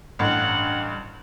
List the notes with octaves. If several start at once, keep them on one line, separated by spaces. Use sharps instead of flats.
A1 G2 F#5